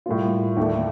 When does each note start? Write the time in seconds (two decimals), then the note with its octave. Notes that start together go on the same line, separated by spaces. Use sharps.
0.06 A2 G3 A#3 F4
0.57 D#2 D3 A3 D4